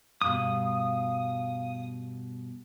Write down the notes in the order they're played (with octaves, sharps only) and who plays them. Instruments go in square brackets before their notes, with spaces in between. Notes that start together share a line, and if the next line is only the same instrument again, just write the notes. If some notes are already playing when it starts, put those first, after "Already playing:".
[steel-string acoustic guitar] G2 B2 [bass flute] F5 [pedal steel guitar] D#6